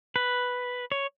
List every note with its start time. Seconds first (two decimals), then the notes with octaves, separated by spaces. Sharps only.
0.16 B4
0.92 C#5